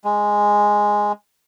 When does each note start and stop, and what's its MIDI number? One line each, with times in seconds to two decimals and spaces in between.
0.05 1.12 56